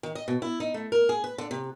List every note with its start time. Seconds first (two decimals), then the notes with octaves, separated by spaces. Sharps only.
0.03 D#3
0.15 D#5
0.28 B2
0.42 E4
0.60 D#4
0.74 A3
0.92 A#4
1.09 G#4
1.24 B4
1.38 D3
1.51 C3